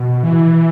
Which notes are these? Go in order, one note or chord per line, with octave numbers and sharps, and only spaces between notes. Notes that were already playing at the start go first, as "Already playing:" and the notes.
Already playing: B2
E3